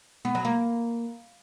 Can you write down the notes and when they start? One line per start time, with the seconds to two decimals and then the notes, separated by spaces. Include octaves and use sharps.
0.25 B3
0.35 F#3
0.45 A#3